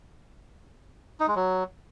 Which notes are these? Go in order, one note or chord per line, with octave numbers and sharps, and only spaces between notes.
D#4
G#3
F#3